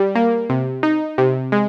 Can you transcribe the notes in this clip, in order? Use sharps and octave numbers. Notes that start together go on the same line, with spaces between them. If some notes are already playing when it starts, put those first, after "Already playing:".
Already playing: G3
A#3
C3
D#4
C3
G#3